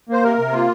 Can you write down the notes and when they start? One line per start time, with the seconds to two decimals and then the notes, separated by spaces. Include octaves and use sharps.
0.09 A#3 C5
0.23 C3 A#4
0.38 C3
0.52 A#3 F4